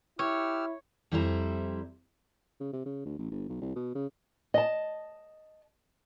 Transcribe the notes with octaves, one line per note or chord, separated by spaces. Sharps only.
E4 G4 C#5 E6 F6
F2 G3 E4 C5 A5 A#5
C#3
C3
C#3
D2
A1
G1
B1
C2
B2
C#3
D#5 A5